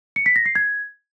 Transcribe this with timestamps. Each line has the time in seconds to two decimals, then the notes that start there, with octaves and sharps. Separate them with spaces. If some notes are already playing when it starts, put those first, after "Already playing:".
0.16 C#7
0.26 B6
0.36 A#6
0.46 C7
0.55 G#6